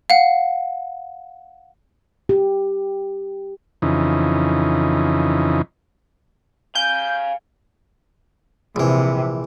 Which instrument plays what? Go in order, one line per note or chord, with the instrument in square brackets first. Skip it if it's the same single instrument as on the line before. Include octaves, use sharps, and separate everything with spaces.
[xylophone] F5 F#5
[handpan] G4
[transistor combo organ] F2 C#3 E3 D#4
[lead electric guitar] F5 G#5 [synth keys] G6
[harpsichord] A#1 E3 [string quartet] C3